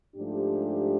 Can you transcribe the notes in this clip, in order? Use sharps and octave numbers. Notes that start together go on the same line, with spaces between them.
G#2 F3 A3 D4 G4